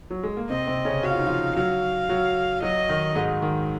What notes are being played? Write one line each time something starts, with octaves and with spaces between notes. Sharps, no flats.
F#3
G#3
A#3
C3 C4 D#5
C3 C4
C#3 C#4
F#4 F5
F4
D#4
F3 F4
F#3 F#4 F5
F#3 F#4
F#3 F#4 D#5
D#3 D#4
G#2 G#3
D#3